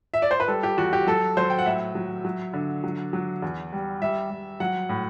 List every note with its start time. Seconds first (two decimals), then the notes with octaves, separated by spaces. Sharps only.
0.14 E5
0.22 D5
0.31 C5
0.40 B4
0.48 G3 A4
0.63 G4
0.77 E2 F#4
0.93 G4
1.07 F#3 A4
1.37 F#3 C5
1.50 G5
1.59 F#5
1.66 A2 E5
1.95 F#3
2.25 F#3
2.54 D3
2.84 F#3
3.13 F#3
3.42 E2
3.72 G3
4.02 G3 E5
4.30 G3
4.60 F#3 F#5
4.89 A2